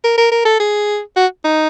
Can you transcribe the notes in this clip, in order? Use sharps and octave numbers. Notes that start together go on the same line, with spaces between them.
A#4
A#4
A#4
A4
G#4
F#4
D#4